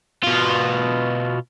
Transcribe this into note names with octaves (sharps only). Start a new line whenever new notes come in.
B2 F4